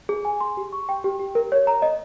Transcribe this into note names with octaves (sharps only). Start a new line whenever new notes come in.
G#4
G#5
C6
G4
C#6
G5
G4
G4
A#4
C#5
A#5
D#5